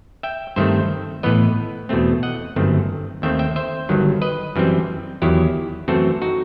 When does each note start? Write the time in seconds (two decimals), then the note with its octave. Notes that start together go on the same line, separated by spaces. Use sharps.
0.23 E5 G5
0.56 G2 D#3 A3 C4 C5 E5
1.23 A2 E3 B3 B4 D#5
1.89 E2 B2 A3 C4
2.23 D#5 F#5
2.56 G1 F#2 D#3 A3 C4
3.22 D#2 D#3 A3 C4 E5 G5
3.39 E5 G5
3.56 C5 E5
3.89 G1 G2 D#3 F#3
4.22 B4 D#5
4.56 F#2 E3 G3 C4
5.22 E2 D#3 F#3 E4 G4
5.88 F#2 E3 A3 C4 F#4 A4
6.22 D#4 F#4